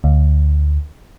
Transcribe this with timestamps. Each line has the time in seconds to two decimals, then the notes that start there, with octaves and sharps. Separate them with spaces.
0.04 D2